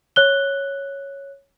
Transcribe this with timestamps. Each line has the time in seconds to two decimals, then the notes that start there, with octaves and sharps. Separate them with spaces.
0.16 C#5 F#6 G7